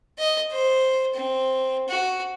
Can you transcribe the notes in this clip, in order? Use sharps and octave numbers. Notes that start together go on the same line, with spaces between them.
D#5
C5
C4
F#4